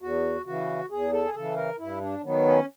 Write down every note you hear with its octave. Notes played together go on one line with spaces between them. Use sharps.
E2 F#4
C#3 E3 F#4
E2 G#4
A4
G#4
C#3 E3 A4
A#4
G2 E4
D4
D#3 F#3 B3
C#4